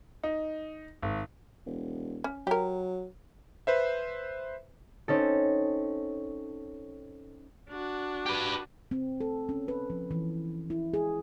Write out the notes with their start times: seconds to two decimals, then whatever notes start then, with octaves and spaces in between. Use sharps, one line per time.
0.24 D#4
1.02 G#1
1.66 E1
2.24 C#4
2.47 F#3 G4 A#4
3.67 B4 C5 E5
5.08 C4 C#4 D#4 A4
7.70 D4 F#4
8.26 G4 B4
8.91 C4
9.21 A4
9.49 C#4
9.68 B4
9.90 F3
10.11 E3
10.70 E4
10.94 G#4